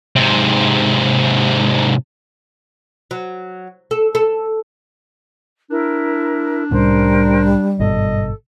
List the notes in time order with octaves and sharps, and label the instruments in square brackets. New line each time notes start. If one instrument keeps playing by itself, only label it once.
[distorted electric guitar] G#2 C3
[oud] F#3
A4
A4
[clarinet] D4 [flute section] E4 A#4
[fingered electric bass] C2 A2 C#4 [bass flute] G3 [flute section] A#4 C5
[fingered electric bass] G#1 G2 B2 [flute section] A4 [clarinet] D#5